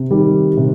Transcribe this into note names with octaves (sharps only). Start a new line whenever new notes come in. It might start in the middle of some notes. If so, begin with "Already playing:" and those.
Already playing: C3
D#3 G3
C3